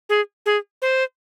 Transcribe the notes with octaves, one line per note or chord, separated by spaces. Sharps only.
G#4
G#4
C5